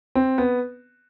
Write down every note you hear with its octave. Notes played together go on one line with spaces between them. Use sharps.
C4
B3